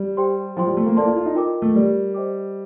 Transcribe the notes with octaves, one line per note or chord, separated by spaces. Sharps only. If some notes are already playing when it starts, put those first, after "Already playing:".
Already playing: G3
G4 C5 G5 C6
F3 F4 C5 G5 C6
G3
A3
A#3
A#3 A4 D5 A5 C6
F4
F4
D#4
F4 A#4 D#5 G5 D6
A3
G3 G4 A#4 D5
C5 D#5 G5 D6